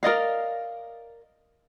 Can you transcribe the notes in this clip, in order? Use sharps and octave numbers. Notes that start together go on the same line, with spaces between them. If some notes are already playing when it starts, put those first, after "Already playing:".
A#4 D5 D#5 F5